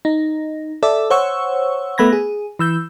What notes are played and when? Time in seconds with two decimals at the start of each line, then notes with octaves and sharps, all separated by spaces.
0.05 D#4
0.83 A4 D5 E5
1.10 C5 C#5 F#5 C#6 E6
1.98 A3 B3 B5 G#6 A#6
2.13 G#4
2.59 E3 E6 G6